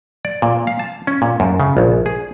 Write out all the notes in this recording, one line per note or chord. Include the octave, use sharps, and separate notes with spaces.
D5
A#2
F5
A5
C#4
A#2
F#2
C#3
A#1
G#4